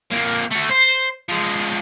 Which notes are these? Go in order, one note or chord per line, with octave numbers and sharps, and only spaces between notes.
F2 A#3
A3 F#4
C5
F3 G#3